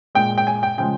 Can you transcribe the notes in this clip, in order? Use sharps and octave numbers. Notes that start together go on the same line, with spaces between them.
A#2 G#3 G5
G5
G#5
G5
C#3 F3 G#3 G5